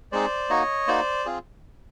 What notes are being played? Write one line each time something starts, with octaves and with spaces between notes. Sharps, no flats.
G#3 C4 D#4 G#4 C5 D5
A#3 D#4 F#4 C#5 D#5
A#3 D#4 F#4 C5 D5
C4 F4 G#4